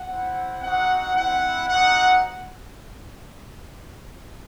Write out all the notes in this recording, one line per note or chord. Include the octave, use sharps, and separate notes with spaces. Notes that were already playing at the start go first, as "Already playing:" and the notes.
Already playing: F#5
C4 E4
C4 D#4 F#4 F#5
C4 E4 F#5
C4 D#4 F#4 F#5